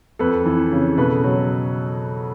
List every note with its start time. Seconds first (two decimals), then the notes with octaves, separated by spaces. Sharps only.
0.19 F2 A4 B4
0.46 E3
0.72 C#3
0.98 B2 A4 B4
1.24 F#3